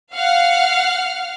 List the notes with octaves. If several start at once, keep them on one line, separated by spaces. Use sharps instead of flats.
F5 F#5 F6